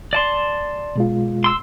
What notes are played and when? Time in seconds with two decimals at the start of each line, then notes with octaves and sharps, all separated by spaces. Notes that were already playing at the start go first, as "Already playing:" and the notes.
0.13 D5 A5 C6
0.96 B2 G#3 F4
1.44 C6 E6